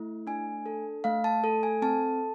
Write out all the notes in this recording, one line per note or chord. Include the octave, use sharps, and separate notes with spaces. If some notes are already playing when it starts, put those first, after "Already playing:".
Already playing: A3 E4
D4 G#5
A4
A3 F5
A5
A4
G#5
C4 A5